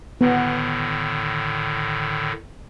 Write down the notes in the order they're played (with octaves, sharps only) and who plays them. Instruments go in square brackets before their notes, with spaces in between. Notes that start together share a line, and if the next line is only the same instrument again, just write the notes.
[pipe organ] A2 D3 D#3 [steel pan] B3